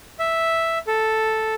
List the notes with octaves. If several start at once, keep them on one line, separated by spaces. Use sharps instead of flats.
E5
A4